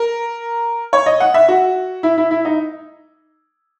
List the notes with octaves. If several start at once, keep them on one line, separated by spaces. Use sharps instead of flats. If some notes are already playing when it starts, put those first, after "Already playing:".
Already playing: A#4
C#5
D#5
F#5
E5
F#4
E4
E4
E4
D#4